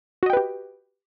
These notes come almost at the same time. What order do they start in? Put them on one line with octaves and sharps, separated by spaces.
F#4 D#5 G5 B4 G4